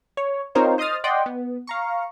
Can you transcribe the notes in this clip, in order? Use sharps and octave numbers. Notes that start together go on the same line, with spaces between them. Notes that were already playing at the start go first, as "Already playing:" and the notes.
C#5
C4 D#4 F4 A#4 C5 C#5
C5 D#5 C6 D#6 F6 A6
D5 D#5 F#5 G5 C6
B3
F5 A#5 C#6